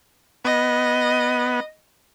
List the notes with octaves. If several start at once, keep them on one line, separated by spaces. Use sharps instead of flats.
B3 D#5